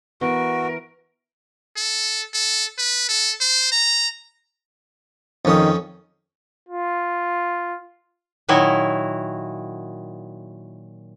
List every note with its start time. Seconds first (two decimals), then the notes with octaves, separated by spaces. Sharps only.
0.21 E3 B3 F#4 A#4
1.77 A4
2.34 A4
2.78 B4
3.09 A4
3.41 C5
3.72 A#5
5.45 F2 D#3 C#4 D#6
6.69 F4
8.49 A#2 D#3 F#3 E4 F#4